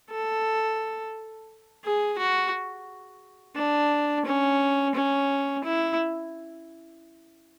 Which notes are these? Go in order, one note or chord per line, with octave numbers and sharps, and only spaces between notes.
A4
G#4
F#4
D4
C#4
C#4
E4